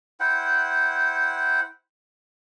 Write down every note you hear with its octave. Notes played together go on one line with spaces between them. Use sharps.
E4 C5 F#5 G5